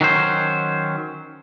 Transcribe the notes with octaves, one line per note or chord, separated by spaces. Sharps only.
D#3 F#3 C#4 C5